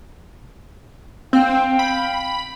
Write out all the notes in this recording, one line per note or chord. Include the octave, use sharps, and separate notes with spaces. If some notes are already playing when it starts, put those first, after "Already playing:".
C4 F5 G5
B5